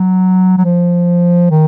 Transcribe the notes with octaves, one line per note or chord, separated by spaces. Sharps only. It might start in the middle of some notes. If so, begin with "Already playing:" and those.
Already playing: F#3
F#3
F3
D#3